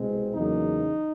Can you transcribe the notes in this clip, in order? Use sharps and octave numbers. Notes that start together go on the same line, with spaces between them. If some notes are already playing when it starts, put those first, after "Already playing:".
Already playing: C2 B2 G#3 C4
E2 C#3 F#3 A#3 D#4